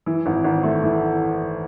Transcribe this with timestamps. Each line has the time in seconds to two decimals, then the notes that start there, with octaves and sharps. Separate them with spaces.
0.06 E3
0.26 G#1
0.44 G#1
0.64 A3
0.83 E3